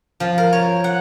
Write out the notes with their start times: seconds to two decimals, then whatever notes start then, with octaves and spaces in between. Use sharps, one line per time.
0.20 F3
0.38 A#4
0.53 C#5
0.84 F#5